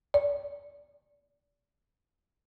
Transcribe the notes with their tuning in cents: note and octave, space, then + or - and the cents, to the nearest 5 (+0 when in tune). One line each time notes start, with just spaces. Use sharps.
D5 -30